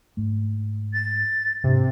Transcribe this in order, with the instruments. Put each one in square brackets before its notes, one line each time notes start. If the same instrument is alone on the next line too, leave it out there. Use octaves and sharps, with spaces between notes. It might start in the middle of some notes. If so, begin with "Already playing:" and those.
[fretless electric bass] G#2 A3
[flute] A6
[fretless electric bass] G#2 D4 [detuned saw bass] C3